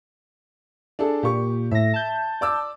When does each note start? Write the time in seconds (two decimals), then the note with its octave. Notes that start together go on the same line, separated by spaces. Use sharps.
0.99 D4 G#4 A4
1.23 A#2 G4 C#6
1.71 A2 E5 A#6
1.93 A5 G6
2.41 D5 D6 E6